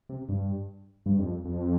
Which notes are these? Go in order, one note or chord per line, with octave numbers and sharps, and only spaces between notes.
C3
G2
G2
F2
F2